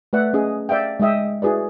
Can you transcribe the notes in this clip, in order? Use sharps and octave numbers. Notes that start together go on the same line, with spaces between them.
A3 B4 D5 E5 F#5
C#4 G#4 D#5
D5 E5 F5 G5
G#3 D#4 D#5 E5 G5
E4 F#4 G#4 B4 D5